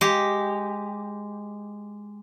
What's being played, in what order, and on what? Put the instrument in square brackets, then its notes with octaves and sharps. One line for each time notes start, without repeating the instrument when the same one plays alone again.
[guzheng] G#3 G4